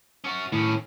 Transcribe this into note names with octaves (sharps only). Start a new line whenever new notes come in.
C#4 F#4
A2 D#3 C#4